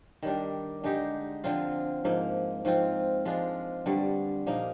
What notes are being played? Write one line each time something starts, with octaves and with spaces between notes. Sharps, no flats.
D#3 G3 D4
D3 G#3 D#4 G4
D3 F3 C4 F4
G#2 F3 A#3
G#2 F3 C4 F4
F3 G#3 D4 F4
G2 D3 G3
A#2 F3 A#3 D#4